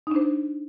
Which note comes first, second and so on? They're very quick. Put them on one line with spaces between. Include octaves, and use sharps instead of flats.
D#4 D4 C5